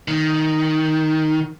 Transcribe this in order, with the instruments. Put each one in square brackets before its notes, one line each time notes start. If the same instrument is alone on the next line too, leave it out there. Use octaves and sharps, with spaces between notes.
[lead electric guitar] D#3